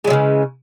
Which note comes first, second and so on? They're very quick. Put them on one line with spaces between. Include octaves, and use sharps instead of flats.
G#3 F#3 C#3 E3